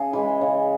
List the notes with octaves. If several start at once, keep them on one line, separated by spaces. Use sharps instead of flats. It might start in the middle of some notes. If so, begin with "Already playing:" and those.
Already playing: C#3 G#4
E3 G#3 B4
C#3